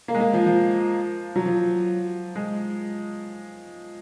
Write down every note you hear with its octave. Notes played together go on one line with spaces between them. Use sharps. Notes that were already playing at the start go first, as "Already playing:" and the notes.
A#3
G#3
A#3
F3
F3
F#3
F3
G#3